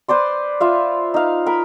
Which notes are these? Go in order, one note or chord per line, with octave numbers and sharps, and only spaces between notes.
B4 C5 D5 C6
F4 E5 F5
D#4 F5
A#4 B5